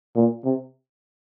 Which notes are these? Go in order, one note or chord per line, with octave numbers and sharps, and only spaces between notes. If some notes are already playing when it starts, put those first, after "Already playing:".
A#2
C3